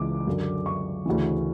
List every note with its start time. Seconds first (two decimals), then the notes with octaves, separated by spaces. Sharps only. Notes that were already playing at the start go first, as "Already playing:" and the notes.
Already playing: C#2 C#3 E3 D6
0.27 F#2 D3
0.66 C#6
1.06 D2 C#3 E3